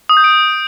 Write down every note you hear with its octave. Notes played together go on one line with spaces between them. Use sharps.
D#6
G6
D7